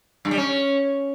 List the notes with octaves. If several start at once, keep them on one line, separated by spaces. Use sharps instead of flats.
G2
G3
C#4